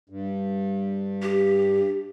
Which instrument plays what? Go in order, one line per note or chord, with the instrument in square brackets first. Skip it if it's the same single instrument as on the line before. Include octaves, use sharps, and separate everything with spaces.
[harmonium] G2
[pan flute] G4